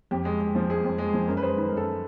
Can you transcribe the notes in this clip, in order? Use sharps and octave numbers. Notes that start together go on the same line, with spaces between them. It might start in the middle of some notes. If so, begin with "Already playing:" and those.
F2 G4
G#3
G#3
F3
G#3 G#4
F2
G#3
F3
F#2 A#4
B4
G#3 C5
D#3 B4
F#2 A#4
A4